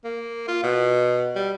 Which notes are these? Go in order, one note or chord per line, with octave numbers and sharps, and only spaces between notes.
A#3
F4
B2
G3